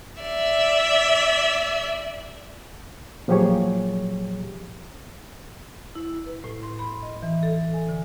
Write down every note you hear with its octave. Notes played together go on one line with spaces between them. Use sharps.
D5 E5
A#2 F3 F#3 G4 G#4 C#5
E4
B4
A2
C6
B5
D#5
E3
A4
G#5
D3